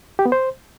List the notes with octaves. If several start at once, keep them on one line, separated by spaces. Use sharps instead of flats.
G4
B3
C5